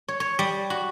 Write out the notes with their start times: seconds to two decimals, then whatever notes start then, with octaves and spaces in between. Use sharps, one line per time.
0.08 C#5
0.20 C#5
0.39 G3
0.70 F#4